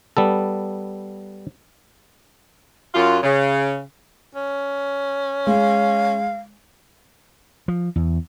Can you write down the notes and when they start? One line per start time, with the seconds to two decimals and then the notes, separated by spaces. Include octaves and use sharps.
0.17 G3 B3 A4
2.94 F#2 F4
3.23 C#3
4.35 C#4
5.47 G#3 F5
7.68 F3
7.96 E2